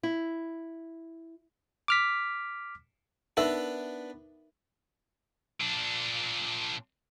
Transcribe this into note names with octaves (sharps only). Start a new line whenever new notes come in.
E4
D6 F6 B6
B3 D4 D#4 A#4 B4 E5
A#2 D4